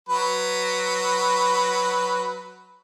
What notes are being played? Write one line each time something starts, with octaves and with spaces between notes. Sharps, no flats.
F#3 B4